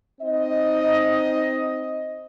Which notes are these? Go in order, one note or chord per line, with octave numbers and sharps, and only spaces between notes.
C4 D#4 D#5